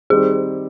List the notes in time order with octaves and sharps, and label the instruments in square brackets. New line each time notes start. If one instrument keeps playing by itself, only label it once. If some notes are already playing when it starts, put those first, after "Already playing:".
[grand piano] D#3 G3 C4 D#4 G4 [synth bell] G#4